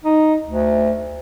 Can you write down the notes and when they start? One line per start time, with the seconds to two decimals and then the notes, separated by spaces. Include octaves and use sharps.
0.04 D#4
0.45 D2